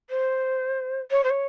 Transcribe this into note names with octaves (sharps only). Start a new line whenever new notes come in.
C5
C#5
C5
C#5